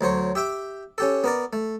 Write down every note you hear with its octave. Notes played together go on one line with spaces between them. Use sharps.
D2 F#3 C5 C#5
G4 E5 G5 D6
C#4 G4 A4
B3 A#4 D5
A3